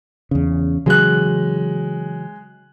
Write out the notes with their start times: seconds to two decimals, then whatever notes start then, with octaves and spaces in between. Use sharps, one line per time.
0.31 E2 C#3
0.86 C#3 E3 F#3 G#3 F#6